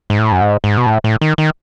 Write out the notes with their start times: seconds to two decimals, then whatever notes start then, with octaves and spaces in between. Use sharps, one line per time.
0.10 G#2
0.19 A2
0.32 F#2
0.41 G#2
0.64 G#2
0.77 B2
0.86 A2
1.04 A2
1.21 D#3
1.38 D#3